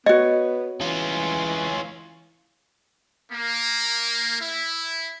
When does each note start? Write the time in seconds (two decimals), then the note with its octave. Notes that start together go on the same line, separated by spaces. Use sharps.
0.06 B3 F#4 C#5 D#5
0.81 E3 C#4 F4
3.32 A#3
4.40 E4